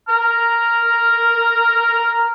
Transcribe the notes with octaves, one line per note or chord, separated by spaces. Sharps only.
A#5 F6